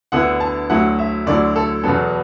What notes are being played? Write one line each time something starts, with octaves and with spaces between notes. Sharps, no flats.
D2 D3 B3 E4 F#5
A5
D2 D3 F#3 A3 E4 F#5
E5
D2 D3 F#3 A3 E4 D5
A4
E2 B2 F#3 B3 A4